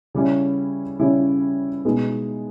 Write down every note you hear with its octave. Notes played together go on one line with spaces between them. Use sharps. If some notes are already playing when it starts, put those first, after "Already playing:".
C#3 G3 C#4 E4
C#3 G3 C#4 E4
B2 G#3 B3 D#4